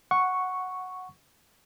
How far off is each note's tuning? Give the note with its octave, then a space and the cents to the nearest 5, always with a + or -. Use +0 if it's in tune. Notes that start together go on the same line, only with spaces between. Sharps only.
F#5 -5 C#6 +0